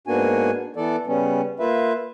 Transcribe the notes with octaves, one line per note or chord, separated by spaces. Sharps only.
G#2 A#3 B3 D4 F#4 G#5
E3 B3 A4 D5
C#3 G3 B3 C#4
A#3 F4 B4 E5